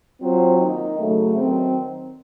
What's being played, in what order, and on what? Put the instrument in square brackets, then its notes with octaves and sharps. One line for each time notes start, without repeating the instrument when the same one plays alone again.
[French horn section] F#3 C4 F4 C5
D#3 A#3 D#4
C#3 F#3 A3
D#3 F#3 C4